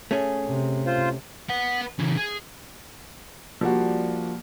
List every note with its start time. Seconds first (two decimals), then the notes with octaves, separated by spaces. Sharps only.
0.11 A3 C#4 G#4
0.47 C3
0.86 F4 C5
1.49 B4 F#5
1.99 C#3 E3
2.17 G#4
3.61 F3 G3 A#3 D4 F#4